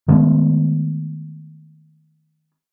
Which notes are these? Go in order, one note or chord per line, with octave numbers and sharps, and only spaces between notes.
D#3 G#3 A3 B3